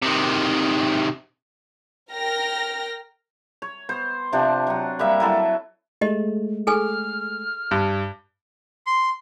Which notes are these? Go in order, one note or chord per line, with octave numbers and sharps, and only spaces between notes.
C3 D#3
A#4 G5 F6 A#6
C#5
B3 C5
C3 F3 D4 G4
F#3 F#5
G3 A#3 E5
F#3 E4 A4
G#3 A3 G4 D#5
G#4 A4 G#5 F6
G2
C6